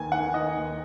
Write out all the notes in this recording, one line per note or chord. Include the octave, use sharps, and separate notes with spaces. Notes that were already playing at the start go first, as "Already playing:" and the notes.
Already playing: D#2 D#3 G#5
D#3 F#5
D#3 D#5
D#2